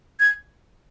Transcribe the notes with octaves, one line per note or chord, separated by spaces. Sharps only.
G#6